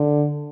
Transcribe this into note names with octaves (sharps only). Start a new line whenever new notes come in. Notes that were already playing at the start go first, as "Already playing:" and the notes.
Already playing: D3